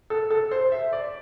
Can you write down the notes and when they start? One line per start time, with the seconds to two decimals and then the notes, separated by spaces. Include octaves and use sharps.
0.10 A4
0.31 A4
0.51 C5
0.72 E5
0.93 D5